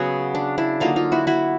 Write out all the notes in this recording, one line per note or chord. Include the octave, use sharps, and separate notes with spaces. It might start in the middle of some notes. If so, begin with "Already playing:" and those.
Already playing: C#3 F#3 B3 F#4 G#4
D4
D4 E4
D3 F#3 A#3 D#4 F4
D#4 F4
E4 F#4
E4 F#4